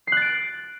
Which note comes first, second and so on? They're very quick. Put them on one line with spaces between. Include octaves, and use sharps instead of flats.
C7 F#6 A6 D7